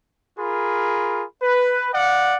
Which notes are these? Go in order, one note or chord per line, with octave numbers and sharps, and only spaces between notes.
F4 G#4 A#4 B5
B4
D5 F5 F#5